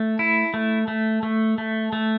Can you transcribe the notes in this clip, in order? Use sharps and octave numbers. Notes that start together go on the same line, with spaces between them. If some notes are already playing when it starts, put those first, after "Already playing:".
Already playing: A3
E4
A3
A3
A3
A3
A3